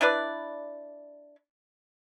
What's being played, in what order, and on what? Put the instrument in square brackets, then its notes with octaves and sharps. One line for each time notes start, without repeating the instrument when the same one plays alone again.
[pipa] D4 E4 B4 D5